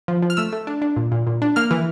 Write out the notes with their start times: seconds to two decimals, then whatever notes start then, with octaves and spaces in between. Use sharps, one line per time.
0.08 F3
0.22 F3
0.30 F6
0.37 A3 E6
0.53 A3
0.67 D4
0.82 D4
0.97 A#2
1.12 A#2
1.27 A#2
1.42 D4
1.56 A#3 F6
1.71 E3